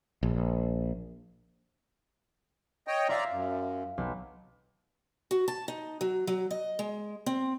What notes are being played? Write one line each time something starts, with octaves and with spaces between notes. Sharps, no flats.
A#1
C#5 D#5 G5
F4 D5 E5 F5 A#5
F#2
B1
F#4
A5
D#4
F#3
F#3
D#5
G#3
C4